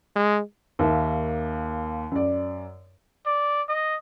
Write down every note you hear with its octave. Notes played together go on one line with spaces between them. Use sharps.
G#3
D#2 A#3 E5
F#2 D5
D5
D#5